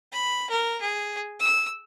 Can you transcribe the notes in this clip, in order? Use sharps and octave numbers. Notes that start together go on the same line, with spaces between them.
B5
A#4
G#4
E6